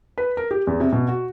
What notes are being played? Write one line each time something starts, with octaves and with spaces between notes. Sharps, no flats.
B4
A#4
G4
E2
C3
B2
F#4